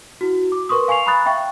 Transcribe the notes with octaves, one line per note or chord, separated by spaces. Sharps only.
E4 F#4
D6
A#4 B4 C6 C#6 D#6
F5 G#5 C#6 C7 F7
A#5 B5 D#6 F#6 A6
E5 F5 G5 C#6